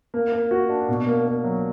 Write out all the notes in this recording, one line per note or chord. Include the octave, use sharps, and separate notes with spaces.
A#3
A#3
F#4
D4
B2
A#3
A#3
F#3